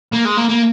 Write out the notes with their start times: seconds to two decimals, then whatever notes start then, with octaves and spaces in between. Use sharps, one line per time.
0.12 A#3
0.25 G#3
0.37 A#3
0.49 A#3